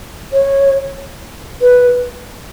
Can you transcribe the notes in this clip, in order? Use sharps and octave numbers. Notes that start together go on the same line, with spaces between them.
C#5
B4